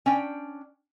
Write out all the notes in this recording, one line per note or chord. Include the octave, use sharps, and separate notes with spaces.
C#4 D4 G5